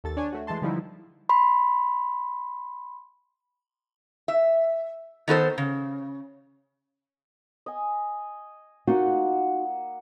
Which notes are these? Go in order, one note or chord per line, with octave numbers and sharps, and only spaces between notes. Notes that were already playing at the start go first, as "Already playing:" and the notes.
D#2 A4 A6
D4 C#5 G#5
A3 F#4
E3 G#3 A3 A5 C6
D3 E3 F3 G3 D#4 E4
B5 C6
E5
D#3 B3 A4 C5
C#3
D#5 G#5
A#3 D#4 F4 F#4 F#5